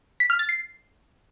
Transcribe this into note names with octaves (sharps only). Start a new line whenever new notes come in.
B6
F6
A6
C7